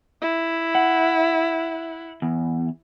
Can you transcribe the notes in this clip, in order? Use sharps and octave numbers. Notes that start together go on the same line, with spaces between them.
E4
F#5
E2